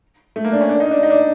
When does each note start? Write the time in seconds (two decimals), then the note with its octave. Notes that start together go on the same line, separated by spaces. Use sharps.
0.36 A3
0.44 A#3
0.52 D4
0.61 C#4
0.69 D4
0.80 D#4
0.91 D4
1.03 D#4
1.10 D4